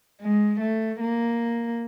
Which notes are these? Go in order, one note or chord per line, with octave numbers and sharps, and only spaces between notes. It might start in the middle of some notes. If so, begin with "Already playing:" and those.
G#3
A3
A#3